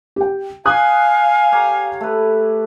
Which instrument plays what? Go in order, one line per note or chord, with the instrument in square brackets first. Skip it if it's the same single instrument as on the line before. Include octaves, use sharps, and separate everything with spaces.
[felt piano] G4 G5
[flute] F5 [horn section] G#5 [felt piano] D#6 F#6
[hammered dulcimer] G4 C#5 A#5
A3 B4